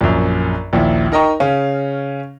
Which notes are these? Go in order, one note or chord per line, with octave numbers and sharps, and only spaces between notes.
A#1 F#2
A#1 D#2 E4
D#4 A#4 D#5 G5 A#5 C#6
C#3 C#4 F5